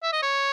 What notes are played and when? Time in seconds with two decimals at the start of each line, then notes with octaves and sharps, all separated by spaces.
0.03 E5
0.13 D#5
0.23 C#5